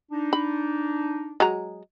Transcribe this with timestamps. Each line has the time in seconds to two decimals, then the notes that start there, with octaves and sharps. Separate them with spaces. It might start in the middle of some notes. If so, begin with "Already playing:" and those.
0.12 D4 D#4
0.33 B5
1.40 F#3 G#3 A#5